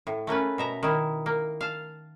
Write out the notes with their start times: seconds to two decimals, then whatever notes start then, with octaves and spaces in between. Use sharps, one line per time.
0.07 A2
0.27 A3 A#3 C#4 B4
0.58 B2 E5 A#5
0.83 D#3 E4
1.26 A#3
1.61 F5 A5